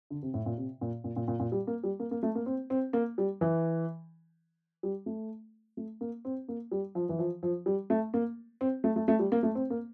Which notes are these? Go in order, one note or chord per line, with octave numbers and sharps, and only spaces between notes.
D3
C3
A2
A#2
C3
A#2
A#2
A#2
A#2
A#2
G3
A#3
G3
A#3
A#3
A3
A#3
C4
C4
A#3
G3
E3
G3
A3
A3
A#3
C4
A#3
G3
F3
E3
F3
F3
G3
A3
A#3
C4
A3
A3
A3
G3
A#3
A3
C4
A#3